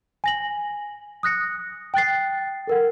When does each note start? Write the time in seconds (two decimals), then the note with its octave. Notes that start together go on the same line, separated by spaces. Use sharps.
0.24 G#5 A#6 F#7
1.23 D#6 F#6 A#6 C#7
1.94 G5 F#6 A6 C7
2.67 A4 A#4 F#5